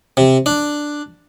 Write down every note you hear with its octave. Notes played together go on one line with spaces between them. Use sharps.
C3
D4